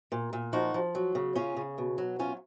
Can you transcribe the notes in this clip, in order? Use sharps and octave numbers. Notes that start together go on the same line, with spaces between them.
A#2
A#2
F3 D#4 F#4
F3
F#3
C#3
C#3 C#4 F4
C#3
B2
F#3
F#3 C#4 F4